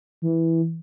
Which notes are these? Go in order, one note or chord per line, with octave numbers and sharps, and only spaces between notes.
E3